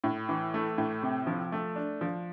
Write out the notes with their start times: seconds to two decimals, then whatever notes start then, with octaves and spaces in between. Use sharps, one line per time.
0.04 A2
0.29 E3
0.54 A3
0.78 A2
1.03 C3
1.27 F3
1.52 A3
1.76 D4
2.01 F3